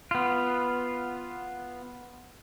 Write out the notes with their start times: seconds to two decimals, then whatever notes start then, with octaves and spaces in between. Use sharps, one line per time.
0.11 B3 F4